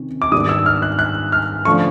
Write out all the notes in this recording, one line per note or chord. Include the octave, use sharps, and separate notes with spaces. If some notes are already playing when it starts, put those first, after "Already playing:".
Already playing: C3 D#3 C#4
D6
G#2 D#3 G3 B3 D4 D#6
E6
F6
F#6
F#6
F6
D3 F3 A3 C#4 C#6